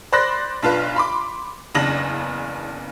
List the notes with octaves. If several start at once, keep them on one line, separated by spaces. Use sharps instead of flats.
C5 D5 B5 C6 F#6 A#6
B1 D4 F4 B4
B5 C6 D6
F#1 E2 C#3 D4 A#6 F#7